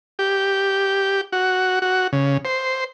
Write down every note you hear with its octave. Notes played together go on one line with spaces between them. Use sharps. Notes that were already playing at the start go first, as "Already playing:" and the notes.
G4
F#4
F#4
C#3
C5